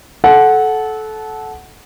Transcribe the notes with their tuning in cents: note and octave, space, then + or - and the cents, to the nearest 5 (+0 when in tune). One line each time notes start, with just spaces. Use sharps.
A4 -20 F#5 +0